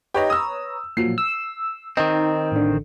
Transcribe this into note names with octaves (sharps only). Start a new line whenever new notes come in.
D#4 G4 B4 C#5 A#5
D#6 E6
A#2 F3 F#3 C7
E6
D#3 C4 D#4
A1 D3